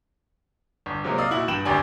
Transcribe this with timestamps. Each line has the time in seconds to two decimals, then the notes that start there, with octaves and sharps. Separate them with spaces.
0.86 G1
1.04 C3 F#3 G#3 A#3 C4 D#4
1.18 D5 D#5 F5 D#6 E6
1.31 A#2 E4 F#4 F#7
1.48 G2 G5 B5 E7 F#7
1.65 D1 G#1 D2 G4 D5 G#5